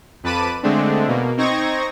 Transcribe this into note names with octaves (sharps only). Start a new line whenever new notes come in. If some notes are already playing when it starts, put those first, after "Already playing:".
F2 B4 A5 B5 D6 D#7
D3 G#3 A3 C4 D4
B2 A#3
C4 D#4 C#6 G#6 A#6